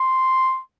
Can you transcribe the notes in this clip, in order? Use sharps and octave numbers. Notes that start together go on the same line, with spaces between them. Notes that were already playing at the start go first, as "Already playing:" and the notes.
Already playing: C6